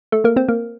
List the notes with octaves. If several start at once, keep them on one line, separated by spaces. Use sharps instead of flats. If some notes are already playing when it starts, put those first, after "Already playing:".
A3 A4
A#3 A#4
C4 C5
A#3 A#4